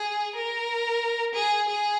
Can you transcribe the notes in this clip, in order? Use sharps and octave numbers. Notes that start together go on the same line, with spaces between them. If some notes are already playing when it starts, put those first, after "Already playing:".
Already playing: G#4
A#4
G#4
G#4